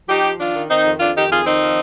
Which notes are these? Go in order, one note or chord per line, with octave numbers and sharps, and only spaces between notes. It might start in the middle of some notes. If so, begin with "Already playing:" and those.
F3 D#4 G4
F3
D#3 D4 F4
D#3
D#3 C4 D#4
F2
F2 D4 F4
D#3 D#4 G4
F2 F4 G#4
D#3 C4 D#4
F3